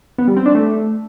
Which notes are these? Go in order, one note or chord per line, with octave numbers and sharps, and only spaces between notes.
B3
G3
C4
D4
A3